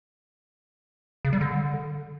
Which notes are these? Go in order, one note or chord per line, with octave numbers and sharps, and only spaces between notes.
C#3
G3
D3